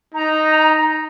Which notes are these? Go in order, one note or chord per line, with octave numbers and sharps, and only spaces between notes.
D#4 A#5